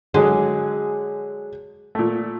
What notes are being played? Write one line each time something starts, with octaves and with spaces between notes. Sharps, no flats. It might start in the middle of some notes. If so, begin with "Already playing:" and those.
D3 F#3 G#3 G#4
A#2 A3